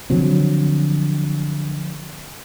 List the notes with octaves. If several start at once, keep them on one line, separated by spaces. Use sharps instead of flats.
D3 F3 F#3 C4